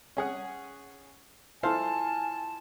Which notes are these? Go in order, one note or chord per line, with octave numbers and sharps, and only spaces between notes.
C#4 G#4 F#5
E4 F4 A4 C5 F5 G#5 A5